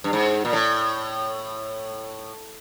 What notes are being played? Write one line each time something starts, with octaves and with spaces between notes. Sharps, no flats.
G2
G#2
A#2
A2